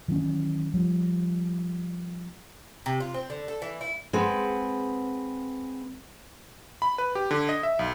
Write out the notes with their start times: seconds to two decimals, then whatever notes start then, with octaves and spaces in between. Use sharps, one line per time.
0.08 D#3 E3 F#3 C#4
0.74 F3 G3
2.86 C3
3.00 F4
3.14 C4
3.30 D3
3.48 A4
3.62 E3
3.81 E4
4.13 G#3 C4 B4 F#5
6.82 B5
6.98 B4
7.15 G4
7.31 D3
7.49 D#5
7.63 E5
7.79 B1